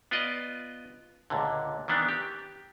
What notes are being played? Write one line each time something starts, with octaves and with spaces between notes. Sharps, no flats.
B3 F4 D5 D#5
C#2 A#2 D3
D#3 E3 B3 D4
G4